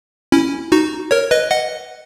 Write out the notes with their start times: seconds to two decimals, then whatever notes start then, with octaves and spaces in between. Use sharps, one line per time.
0.32 C#4 E4
0.72 D#4 F#4
1.11 A#4 C#5
1.31 B4 D#5
1.51 D#5 F#5